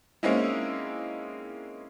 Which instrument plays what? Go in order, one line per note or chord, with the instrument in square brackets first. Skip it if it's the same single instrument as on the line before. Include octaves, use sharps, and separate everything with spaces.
[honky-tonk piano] G#3 A#3 C4 C#4 D#4 E4